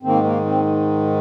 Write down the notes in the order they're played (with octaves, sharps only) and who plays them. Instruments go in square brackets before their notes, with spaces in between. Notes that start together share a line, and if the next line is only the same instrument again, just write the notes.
[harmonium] G#2 D#3 A#3 C4
A#3
C4